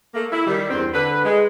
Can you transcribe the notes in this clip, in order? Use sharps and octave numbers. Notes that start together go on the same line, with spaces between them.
A3 A#3
E4
D#3 G3
E2 G2 C4
D3 B4
G#3